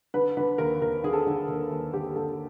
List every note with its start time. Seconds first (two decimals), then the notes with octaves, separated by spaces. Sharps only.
0.14 D3 B4
0.37 D3 B4
0.58 D#2 A#4
0.82 D#2 A#4
1.04 D3 G#4
1.13 A4
1.23 D3 G#4
1.48 D#2
1.71 D#2
1.93 D3 G4
2.16 D3 A4